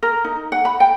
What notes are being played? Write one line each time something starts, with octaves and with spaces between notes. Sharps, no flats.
A#4
D#4
F#5
B5
G5